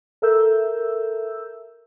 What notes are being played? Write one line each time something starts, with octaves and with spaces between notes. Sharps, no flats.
A4 A#4 E5 E6 G6